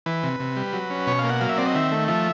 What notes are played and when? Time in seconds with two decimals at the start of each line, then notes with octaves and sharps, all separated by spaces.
0.06 E3 B4
0.23 C3
0.40 C3
0.56 G3
0.73 F#3
0.90 C#4
1.07 B2 C#5
1.19 F5
1.24 A#3
1.30 F#5
1.41 F#3 F5
1.49 E5
1.58 C4 D5
1.66 D#5
1.75 D#3 E5
1.92 A3
2.08 F3 E5